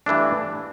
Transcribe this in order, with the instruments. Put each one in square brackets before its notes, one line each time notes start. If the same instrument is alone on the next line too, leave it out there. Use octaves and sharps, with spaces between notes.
[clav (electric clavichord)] G2 E3 A3 D4